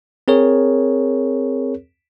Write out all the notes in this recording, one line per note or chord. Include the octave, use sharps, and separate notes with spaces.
C4 G#4 A#4 C#5